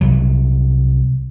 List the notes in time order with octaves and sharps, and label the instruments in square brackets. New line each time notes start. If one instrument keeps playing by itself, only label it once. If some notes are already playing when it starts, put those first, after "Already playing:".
[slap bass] C2 F#3